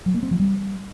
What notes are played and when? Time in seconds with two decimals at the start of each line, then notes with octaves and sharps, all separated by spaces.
0.06 F#3
0.14 A#3
0.23 C4
0.31 F3
0.40 G3